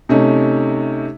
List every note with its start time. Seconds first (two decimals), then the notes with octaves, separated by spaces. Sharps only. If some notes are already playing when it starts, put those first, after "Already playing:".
0.09 C3 A3 C#4 D#4